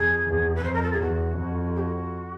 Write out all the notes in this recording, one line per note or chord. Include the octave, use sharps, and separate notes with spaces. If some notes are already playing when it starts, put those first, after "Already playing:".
Already playing: F2 G#4
E2
B4
F2 C5
A#4
A4
G#4
E2 F#4
F2
G#4
F#4